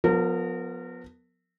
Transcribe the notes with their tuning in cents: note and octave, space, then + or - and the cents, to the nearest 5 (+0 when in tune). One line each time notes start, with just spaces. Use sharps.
F3 +35 B3 +0 A#4 -30